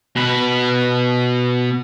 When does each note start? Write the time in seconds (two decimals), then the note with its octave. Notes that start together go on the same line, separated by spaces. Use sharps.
0.16 B2 B4